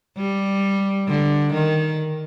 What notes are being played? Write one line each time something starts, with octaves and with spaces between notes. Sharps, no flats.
G3
D3
D#3